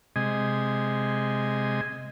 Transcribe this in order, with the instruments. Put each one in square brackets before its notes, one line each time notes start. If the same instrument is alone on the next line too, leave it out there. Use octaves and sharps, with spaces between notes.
[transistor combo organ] C3 G#3 D#5 G#5